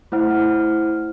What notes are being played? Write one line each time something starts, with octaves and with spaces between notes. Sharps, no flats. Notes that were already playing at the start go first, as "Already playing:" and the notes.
A3 E4 C5 F#5 F6